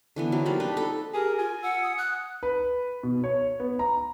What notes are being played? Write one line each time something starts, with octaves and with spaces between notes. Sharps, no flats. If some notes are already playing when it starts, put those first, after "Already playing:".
D3 E3 B3
F#3 C4 D#4
F3 G3 A#3 D5
D4 D#4 B4
D#4 A4
G4 G#4 A#4
F4 G#5
F#5 E6
D#6
F#6
B4
B2
C#5
B3
A#5